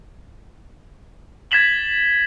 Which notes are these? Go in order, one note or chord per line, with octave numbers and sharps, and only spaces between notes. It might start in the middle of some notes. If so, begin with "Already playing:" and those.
G#6 A6 B6 E7 F#7 G7